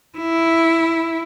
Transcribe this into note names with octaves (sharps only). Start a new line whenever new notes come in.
E4